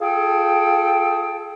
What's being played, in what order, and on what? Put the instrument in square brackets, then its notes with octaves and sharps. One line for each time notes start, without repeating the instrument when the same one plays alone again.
[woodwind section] F4 G#4 A4 G5